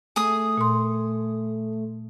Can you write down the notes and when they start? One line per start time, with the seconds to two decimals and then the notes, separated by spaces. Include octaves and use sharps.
0.16 A3 G#4 D#6
0.58 A#2 C6